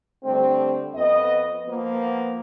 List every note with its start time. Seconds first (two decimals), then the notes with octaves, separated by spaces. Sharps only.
0.25 D3 G3 A3 C4
0.95 F2 B3 D#5
1.67 F3 A#3 B3